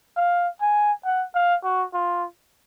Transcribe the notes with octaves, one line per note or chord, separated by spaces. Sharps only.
F5
G#5
F#5
F5
F#4
F4